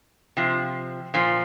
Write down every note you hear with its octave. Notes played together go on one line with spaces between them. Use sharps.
C3 F3
A#2 F3